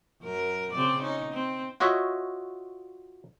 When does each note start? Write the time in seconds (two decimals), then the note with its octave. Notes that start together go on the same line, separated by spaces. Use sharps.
0.22 F#2 A#4
0.73 C#3 C4 D5
1.02 C#4 D#4
1.33 C4
1.80 F4 F#4 C#5 D#5 E5